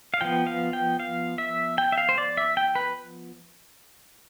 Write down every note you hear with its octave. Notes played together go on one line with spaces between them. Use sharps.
F5
F3 B3 G5
F5
G5
F5
E5
G5
E5
F5
C5
D5
E5
G5
B4